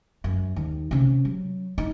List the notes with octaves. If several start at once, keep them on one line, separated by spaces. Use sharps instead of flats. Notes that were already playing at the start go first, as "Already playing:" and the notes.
F#2
D#2
C3 C#4
F#3
D#4